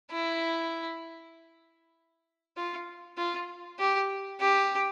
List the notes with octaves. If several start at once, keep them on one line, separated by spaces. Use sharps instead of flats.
E4
F4
F4
G4
G4